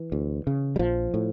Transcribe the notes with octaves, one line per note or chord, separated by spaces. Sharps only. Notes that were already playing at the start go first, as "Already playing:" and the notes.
Already playing: E3
D2
C#3
G3
A#1 F3
A2